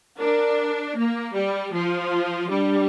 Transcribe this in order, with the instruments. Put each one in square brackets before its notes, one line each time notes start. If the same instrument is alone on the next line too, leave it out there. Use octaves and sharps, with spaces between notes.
[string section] D4 [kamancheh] A#4
[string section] A#3
G3
F3
[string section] G3 [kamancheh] D4